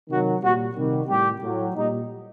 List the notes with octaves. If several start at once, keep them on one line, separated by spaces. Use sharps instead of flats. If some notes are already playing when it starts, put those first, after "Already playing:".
C3 D#3 F#3 F#4
A#2 G3 F#4
C3 D#3 G3
A2 G3 G4
A2 F#3
A#2 G3 D#4